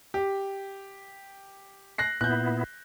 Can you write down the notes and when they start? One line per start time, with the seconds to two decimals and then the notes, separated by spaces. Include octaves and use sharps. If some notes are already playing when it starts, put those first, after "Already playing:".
0.14 G4
1.98 F#6 A#6 C7
2.21 A#2 B3 E4 F#6 G6